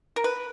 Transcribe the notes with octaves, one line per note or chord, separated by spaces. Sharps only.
A#4
B4